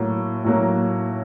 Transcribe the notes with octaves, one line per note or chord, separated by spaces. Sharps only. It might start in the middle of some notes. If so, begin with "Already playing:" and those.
Already playing: A2 F#3 A#3
A2 F#3 A#3